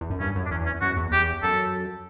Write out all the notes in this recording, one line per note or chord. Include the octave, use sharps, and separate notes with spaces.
E2
F#2
G2 C#4
F#2
D4
E2 C#4
C#4
F#2 F#4
E2
E2 G4
F#2 A4